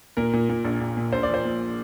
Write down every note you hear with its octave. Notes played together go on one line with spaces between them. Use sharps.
A#2 A#4
A#2
A#2
A#1
A#1
A#2
A#1 C5
D5
F3
C5
A#2